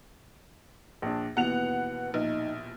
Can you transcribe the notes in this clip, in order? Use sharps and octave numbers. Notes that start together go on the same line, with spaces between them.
A#1 D4
D#2 B2 E3 B3 F#5 F7
A#1 D#4